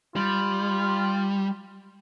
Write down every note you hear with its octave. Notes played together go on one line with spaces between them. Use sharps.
G3 F4